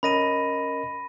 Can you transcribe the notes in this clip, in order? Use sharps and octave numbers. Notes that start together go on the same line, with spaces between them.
C#4 A#4 D#5 B5 A#6 D#7